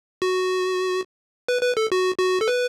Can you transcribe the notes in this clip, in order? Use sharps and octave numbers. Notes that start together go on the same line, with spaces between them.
F#4
B4
B4
A4
F#4
F#4
A4
B4